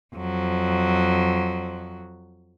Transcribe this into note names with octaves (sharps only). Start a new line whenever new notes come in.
F2 F#3